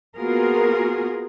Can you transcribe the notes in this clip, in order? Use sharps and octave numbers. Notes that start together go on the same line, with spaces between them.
A#3 B3 F4 F#4 G#4 A#4